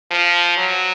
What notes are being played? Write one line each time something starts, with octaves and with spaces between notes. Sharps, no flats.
F3
F#3